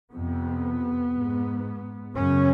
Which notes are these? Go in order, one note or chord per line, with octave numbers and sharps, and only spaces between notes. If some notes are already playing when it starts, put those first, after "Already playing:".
F2 C3 B3
G#2
F#2 C#3 C#4